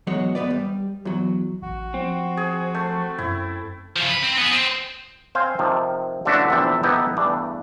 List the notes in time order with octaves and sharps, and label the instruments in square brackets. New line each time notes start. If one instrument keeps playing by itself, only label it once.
[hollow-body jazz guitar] B1 E2 F#3 G#3 F#4 C#5
D#2 G#2 B3 B4 D5
G3
E2 F#3
[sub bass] A1 [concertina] F#4
[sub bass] F3 [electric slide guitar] C4
[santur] G#4
A3
[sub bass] F#2 [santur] E4
[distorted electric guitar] C#3 F3
B4
C4
B3 G#4
C4
[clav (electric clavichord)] C4 C5 F5 G#5
C3 D#3 F3
A1 D3 A3 D4 F#4 E5
A#1 E2 C3 D4 E5 G5
B3 D#4 E4 G4 A4 B4
E2 G2 A3 D4 D5